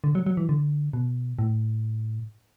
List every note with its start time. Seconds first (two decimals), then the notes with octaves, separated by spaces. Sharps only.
0.04 D3
0.15 F#3
0.26 F#3
0.37 E3
0.49 D3
0.93 B2
1.39 A2